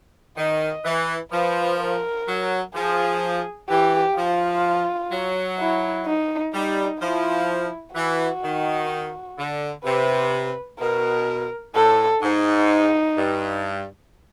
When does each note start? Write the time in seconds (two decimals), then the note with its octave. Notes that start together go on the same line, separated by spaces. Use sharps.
0.37 D#3 D#5
0.84 E3
1.32 F3 B4
1.80 A#4
2.27 F#3
2.74 F3 G#4
3.69 E3 G4
4.16 F3 F4
5.11 F#3
5.59 E4
6.06 D#4
6.54 G3 D#4
7.01 F3 E4
7.95 E3 F#4
8.43 D#3
9.38 D3
9.85 C3 B4
10.80 B2 A#4
11.75 A2 A4
12.22 G#2 D#4
13.17 G2